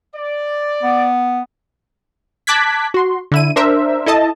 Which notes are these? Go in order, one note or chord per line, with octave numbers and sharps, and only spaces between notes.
D5
B3
A5 D6 F#6 G#6 B6
F#4 C6
D3 E4 D#7
D4 A#4 C5 E5
E4 A4 D#5 A5